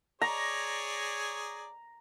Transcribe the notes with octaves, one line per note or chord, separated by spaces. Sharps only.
G#4 C#5 D5 A#5